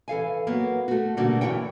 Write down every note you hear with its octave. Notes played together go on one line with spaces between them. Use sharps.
E3 A4 F5 G#5
F#3 A#3 B3
A3 F#4
B2 D3 G3 A3 A#3 F#4
D#2 G#2 E3 E4 C#5 G5